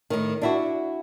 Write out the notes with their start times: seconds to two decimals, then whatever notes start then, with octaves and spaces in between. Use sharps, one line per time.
0.10 A2 D#3
0.42 D4 E4 F#4